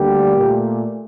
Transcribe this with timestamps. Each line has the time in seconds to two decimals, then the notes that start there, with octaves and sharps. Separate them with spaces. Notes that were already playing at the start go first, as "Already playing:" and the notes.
Already playing: D2 D3 G3 A#3 G4
0.36 A#2 A3